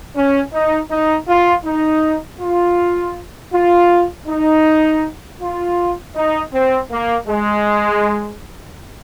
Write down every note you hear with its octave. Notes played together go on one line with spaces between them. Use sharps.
C#4
D#4
D#4
F4
D#4
F4
F4
D#4
F4
D#4
C4
A#3
G#3